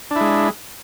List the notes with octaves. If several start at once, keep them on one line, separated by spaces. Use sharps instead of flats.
G#3 D4 E4